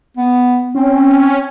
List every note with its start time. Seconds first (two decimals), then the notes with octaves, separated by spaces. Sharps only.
0.17 B3
0.75 C4 C#4